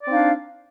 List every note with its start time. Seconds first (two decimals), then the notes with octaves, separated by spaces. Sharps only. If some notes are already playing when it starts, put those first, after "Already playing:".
0.03 D5
0.06 C4
0.09 D#4
0.12 F5
0.15 D4